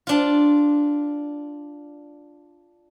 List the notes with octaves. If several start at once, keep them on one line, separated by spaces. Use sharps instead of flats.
D4 F4